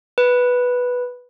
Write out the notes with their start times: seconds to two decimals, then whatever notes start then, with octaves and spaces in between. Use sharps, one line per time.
0.18 B4